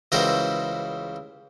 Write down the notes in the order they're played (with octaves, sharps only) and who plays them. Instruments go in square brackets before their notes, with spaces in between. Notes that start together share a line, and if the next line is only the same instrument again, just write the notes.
[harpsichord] C#2 E3 G3 F#4 A#4 C5